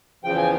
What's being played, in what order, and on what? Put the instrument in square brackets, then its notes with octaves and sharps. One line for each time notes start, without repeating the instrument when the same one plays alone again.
[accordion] E2 C#3 F3 G5
G#5